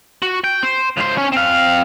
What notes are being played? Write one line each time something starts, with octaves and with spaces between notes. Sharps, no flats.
F#4
G5
C5
C#2 C5
C#4 C#5
C4 F5